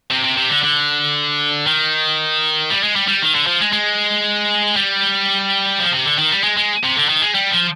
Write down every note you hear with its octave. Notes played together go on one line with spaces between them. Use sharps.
C3
C3
C3
D3
D3
D#3
G3
G#3
G3
G3
D#3
D3
F3
G#3
G#3
G3
F3
C3
D3
D#3
G3
G#3
G#3
C3
D3
D#3
G#3
G3
F3